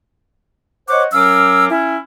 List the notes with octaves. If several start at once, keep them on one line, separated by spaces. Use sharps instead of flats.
C5 C#5 D#5 F#5 C#6 D6
F#3 C#4 A#4 F5 D6 E6
C#4 E4